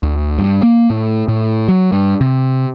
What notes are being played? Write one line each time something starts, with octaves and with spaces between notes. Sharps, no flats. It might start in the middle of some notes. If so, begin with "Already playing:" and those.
D2
G2
A#3
A2
A2
F#3
G2
C3